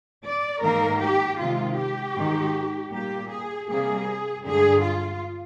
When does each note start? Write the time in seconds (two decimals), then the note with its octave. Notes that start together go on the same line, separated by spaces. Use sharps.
0.25 D5
0.63 G#2 D#3 A#3 A#4
1.02 G4
1.40 C3 D#3 G#3 F4
1.78 G4
2.17 G#2 D#3 G#3
2.93 A#2 G3 A#3 G4
3.31 G#4
3.69 C3 G3 A#3 G#4
4.45 G2 D3 G#3 G#4
4.83 F4